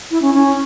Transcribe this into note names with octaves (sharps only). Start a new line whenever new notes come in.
E4
C#4
C#4